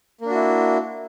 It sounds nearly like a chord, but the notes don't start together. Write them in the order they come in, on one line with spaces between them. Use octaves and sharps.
A#3 D4 F#4 E4